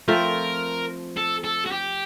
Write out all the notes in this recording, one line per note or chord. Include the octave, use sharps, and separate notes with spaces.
F3 A3 C4 F4 A#4
A4
A4
F#4
G4